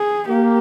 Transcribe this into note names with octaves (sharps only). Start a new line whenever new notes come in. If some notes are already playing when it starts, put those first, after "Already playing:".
Already playing: G#4
A#3 G4